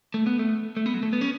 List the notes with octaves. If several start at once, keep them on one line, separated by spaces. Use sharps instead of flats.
A3
B3
A3
A3
B3
F#3
A3
B3
C#4